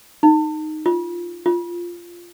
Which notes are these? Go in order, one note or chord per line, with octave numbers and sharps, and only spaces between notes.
D#4
F4
F4